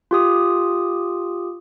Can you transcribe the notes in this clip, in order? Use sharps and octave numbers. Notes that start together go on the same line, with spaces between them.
F4 G4 D#6